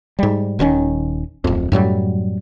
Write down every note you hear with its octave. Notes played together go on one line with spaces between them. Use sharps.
G#2 G3
D#1 D#3 C4 C#4
D1 F2
F#2 A2 F#3 G3